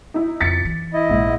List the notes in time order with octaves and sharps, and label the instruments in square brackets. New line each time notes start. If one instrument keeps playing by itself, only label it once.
[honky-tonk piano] D#4 E4
[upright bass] F2 C#3 [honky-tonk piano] A6 B6 C#7
[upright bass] E3
[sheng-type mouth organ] E4 D#5
[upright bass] A#1 [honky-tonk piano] G#2